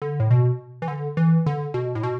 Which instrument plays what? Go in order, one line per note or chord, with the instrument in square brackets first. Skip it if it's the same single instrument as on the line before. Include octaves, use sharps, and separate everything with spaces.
[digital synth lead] D3
A2
B2
E3
D3
E3
D3
B2
A2
B2